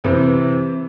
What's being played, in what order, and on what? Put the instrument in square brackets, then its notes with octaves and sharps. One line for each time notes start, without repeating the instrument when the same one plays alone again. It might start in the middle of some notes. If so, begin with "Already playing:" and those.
[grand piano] C3 E3 C4